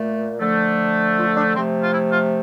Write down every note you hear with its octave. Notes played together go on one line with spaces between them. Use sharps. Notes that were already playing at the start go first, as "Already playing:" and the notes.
Already playing: A#2 A3
D3 F3 A3
F4
D4
C3 F3 A3 C4
F4
E4
F4